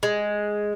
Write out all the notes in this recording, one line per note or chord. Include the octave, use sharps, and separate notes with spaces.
G#3